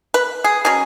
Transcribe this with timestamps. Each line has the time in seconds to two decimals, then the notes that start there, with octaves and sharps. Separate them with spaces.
0.14 B4
0.44 G#4
0.65 B2 F#3 C#4 G#4